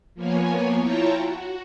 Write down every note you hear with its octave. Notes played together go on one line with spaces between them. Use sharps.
F3 A#3 B3 C#5 G#5
E4 F4 C#5 G5 A5 A#5
F#4